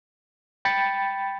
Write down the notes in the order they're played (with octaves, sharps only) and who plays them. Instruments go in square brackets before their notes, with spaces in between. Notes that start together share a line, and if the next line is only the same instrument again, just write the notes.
[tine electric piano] G5 B5 A6 C#7